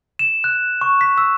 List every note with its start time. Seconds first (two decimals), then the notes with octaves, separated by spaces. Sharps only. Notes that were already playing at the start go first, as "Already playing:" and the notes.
0.19 E7
0.44 F#6
0.81 C#6
1.01 B6
1.18 E6